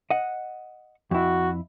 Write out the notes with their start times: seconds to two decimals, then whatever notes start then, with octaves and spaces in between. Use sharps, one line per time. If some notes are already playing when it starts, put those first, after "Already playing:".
0.10 D#5 F#5
1.11 F2 E4 F#4